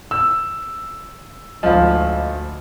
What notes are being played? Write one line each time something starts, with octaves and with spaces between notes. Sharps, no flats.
E6
G#1 D2 F3 D#5 F5